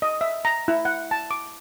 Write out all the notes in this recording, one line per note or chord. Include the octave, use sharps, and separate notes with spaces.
D#5
E5
A#5
E4
F#5
A5
D6